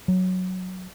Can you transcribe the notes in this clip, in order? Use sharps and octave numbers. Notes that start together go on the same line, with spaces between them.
F#3